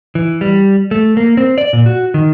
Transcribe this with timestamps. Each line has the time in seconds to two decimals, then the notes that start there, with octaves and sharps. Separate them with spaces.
0.15 E3
0.41 G3
0.91 A3
1.17 A#3
1.37 C4
1.58 D5
1.73 A#2
1.86 F#4
2.14 D#3